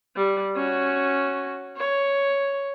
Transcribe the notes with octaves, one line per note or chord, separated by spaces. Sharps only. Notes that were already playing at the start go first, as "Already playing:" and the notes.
G3
C#4 F#4
C#5